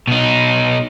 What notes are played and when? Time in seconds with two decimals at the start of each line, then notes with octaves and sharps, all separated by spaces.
0.07 B2 D#4